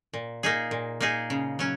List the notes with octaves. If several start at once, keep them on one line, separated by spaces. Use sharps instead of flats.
A#2
A#3 D#4 G#4
A#2
A#3 D#4 G#4
C#3
F#3 C#4